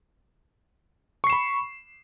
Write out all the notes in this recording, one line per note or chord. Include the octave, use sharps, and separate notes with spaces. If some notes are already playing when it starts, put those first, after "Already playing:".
B5 C#6 C7 E7